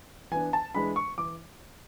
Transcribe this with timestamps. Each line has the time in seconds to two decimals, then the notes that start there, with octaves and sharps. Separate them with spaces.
0.31 E3 B3 D4 G#5
0.53 A5
0.74 E3 G#3 D4 B5
0.96 C#6
1.18 E3 D6